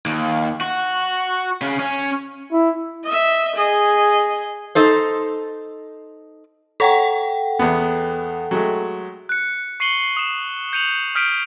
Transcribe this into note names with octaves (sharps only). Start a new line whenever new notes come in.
D#2
F#4
C#3
C#4
E4
D#5 E5
G#4 D#5
D#4 A4 C5
A4 C#5 F#5 G5 A#5
E2 B3
F#3 G#3 A3
F#6 C#7
C#6 C7 C#7 D#7 F#7 G7
D#6 E7
G6 C#7 D#7 F7 F#7
D#6 F6 G6 B6 D7 D#7